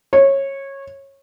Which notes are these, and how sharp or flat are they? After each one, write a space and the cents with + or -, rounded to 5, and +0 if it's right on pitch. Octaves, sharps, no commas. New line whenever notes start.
C#5 -20